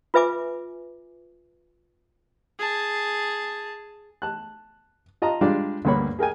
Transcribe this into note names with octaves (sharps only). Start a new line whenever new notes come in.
F4 B4 E5 G#5 D6
G#4 A5
A5 F#6
F4 D#5 A5 A#5
G3 G#3 D4 F4 D5
D2 G2 A#3 C#5 B5
G#4 A#4 G5 G#5